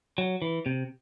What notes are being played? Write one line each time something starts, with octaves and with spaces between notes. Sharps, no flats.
F#3
E3
C3